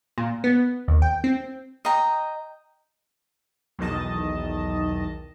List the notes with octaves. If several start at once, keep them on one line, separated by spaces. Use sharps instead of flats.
A#2
B3
D#2
G5
C4
D#5 G5 A#5
B1 E2 D#3 D#5 A5